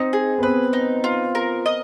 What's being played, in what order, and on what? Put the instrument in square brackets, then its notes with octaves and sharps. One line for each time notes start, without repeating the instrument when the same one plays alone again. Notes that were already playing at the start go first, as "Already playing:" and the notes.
Already playing: [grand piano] C4 [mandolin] D#4
[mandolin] G#4
[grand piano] B3
[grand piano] C4 [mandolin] B4
[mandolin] D#4
F4
A#4
D#5